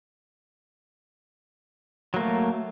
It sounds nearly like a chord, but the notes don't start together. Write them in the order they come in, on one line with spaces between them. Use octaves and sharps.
F#3 A#3 A3